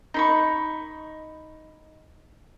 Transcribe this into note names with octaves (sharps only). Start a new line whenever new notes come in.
D#4 B5 C#6